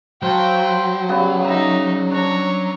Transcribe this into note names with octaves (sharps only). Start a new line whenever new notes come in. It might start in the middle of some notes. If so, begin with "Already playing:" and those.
F#3 C5 F5 G5 A5 B5
C#3 G3 B3
D#4 E5 A#5
D4 C#5 A#5